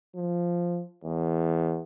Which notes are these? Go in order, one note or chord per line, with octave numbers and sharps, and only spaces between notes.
F3
E2